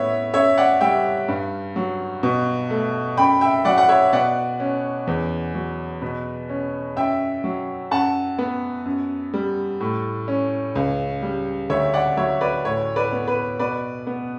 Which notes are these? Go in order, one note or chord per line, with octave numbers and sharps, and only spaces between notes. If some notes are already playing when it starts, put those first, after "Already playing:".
Already playing: A2 B3 C#5 E5
F#2 C#5 E5
D5 F#5
G3 E5 G5
G2
F#3
B2
A3
F#2 G5 B5
E5 G5
F#3 D5 F#5
F#5
C#5 E5
B2 D5 F#5
C#4
E2
F#3
B2
C#4
F#2 E5 G5
F#3
F#2 F#5 A5
B3
F#2
G3
A2
C#4
C#2
G3
D2 C#5 E5
D5 F#5
F#3 C#5 E5
B4 D5
A2 C#5
B4 D5
B3
B4
B2 B4 D5
B3